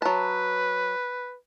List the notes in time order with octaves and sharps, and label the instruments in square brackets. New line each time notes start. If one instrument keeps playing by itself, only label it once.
[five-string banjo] F#3 A5 [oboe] B4